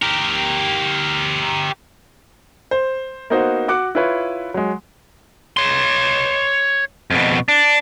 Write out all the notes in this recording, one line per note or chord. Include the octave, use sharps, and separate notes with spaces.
G4 A#4
C5
A#3 B3 D#4 F#4 C5
F#4 D6 F#6 C#7
E4 F4 B4 C#5
F#3 G#3
C#5 C6
F2 B2
D4